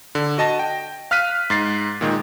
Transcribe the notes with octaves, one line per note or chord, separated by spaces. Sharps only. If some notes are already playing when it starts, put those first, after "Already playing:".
D3
F#4 D#5 A5 A#6
G5
F5 F6 F#6 B6 D#7
G#2 A6 C7
A#2 D#3 G#3